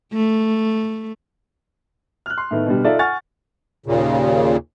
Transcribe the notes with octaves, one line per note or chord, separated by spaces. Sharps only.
A3
F6 F#6
C6
A2 D#3 A3 B3
B2 D3 G3
D#4 F4 A4 D5 E5
F#5 G#5 C#6 F6 A6
D#2 A#2 C#3